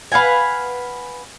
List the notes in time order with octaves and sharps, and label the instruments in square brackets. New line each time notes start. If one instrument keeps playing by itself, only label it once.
[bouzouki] B4 F5 F#5 G#5